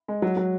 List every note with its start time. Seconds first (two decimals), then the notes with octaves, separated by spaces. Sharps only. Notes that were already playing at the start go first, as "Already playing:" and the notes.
0.08 G#3
0.22 F#3
0.37 F#3